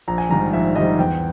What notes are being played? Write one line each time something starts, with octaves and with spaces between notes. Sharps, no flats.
A#1 A#5
G#5
G#2 D#3 G3 A#5
A#1 E5
G#2 D#3 G3 D#5
E2 G5